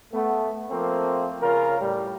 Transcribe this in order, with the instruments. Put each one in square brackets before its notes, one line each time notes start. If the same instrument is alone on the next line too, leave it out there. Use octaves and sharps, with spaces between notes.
[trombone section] A3 B3
F3 A3 A#3 C4
C#3 F4 A#4
A2 G3